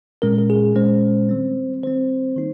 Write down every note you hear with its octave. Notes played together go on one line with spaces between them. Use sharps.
A#2 G#3 C#4 A#4
A#4
G#4
A#2 G#3 C#4 C5
D#3 G3 C4
D#3 G3 C4 C5
D#3 A#3 D#4